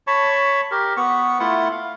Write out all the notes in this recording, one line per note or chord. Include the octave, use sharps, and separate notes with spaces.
C#5 A5 B5 C#6
G4 A#4
B3 C#6
A3 E4 F4 F#5
F5